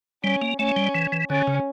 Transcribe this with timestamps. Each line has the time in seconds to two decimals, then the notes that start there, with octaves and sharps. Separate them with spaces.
0.24 G3 C#4
0.42 A#3
0.59 A3 C#4
0.76 G3
0.95 E3
1.12 E3
1.30 D3 C#4
1.47 C#3